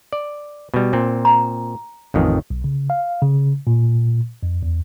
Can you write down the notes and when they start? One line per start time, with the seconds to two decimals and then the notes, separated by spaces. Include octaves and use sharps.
0.13 D5
0.74 B2 G3
0.93 A#2 C4
1.25 A#5
2.14 A1 F2 D#3
2.50 B1
2.64 C#3
2.90 F5
3.22 C#3
3.67 A#2
4.43 F2
4.63 E2